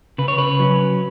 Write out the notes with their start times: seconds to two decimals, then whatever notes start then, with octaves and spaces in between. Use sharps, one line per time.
0.18 C#3 B4
0.28 C#5
0.38 B4
0.59 F#3 C#4